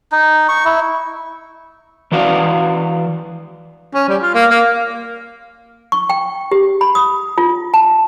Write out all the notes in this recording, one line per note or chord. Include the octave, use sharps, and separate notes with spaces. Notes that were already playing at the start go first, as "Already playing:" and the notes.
D#4
C#6
E4
E3 F#4 D5 F5
C#4
G3
F4
A#3
A#3
C#6
G5
G4
B5
D#6
F4
A5